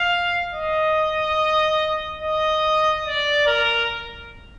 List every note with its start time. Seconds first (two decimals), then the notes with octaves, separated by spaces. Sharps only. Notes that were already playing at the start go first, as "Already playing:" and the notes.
Already playing: F5
0.53 D#5
2.22 D#5
3.05 D5
3.47 A#4